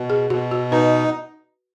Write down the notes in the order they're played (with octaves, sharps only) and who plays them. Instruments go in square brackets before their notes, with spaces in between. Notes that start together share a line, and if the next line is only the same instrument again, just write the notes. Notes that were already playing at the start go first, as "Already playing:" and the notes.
Already playing: [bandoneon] B2
[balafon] G#4
[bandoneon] B2 [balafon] F#4
[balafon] F#4
[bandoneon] D#4 [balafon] B4